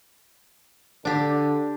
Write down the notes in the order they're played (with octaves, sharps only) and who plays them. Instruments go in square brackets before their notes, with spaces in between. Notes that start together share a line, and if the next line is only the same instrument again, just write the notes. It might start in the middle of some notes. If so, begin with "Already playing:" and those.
[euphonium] D3 [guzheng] D4 G4